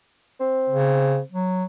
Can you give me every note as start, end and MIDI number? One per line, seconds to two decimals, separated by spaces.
0.40 1.20 60
0.69 1.20 49
1.32 1.64 54